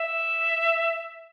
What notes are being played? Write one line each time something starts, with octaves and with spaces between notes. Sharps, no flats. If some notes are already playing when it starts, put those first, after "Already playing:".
Already playing: E5